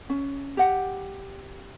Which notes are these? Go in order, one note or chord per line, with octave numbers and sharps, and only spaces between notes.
C#4
G4 F#5